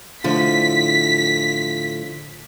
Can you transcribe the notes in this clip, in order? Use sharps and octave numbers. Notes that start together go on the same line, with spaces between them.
A2 D3 F3 B6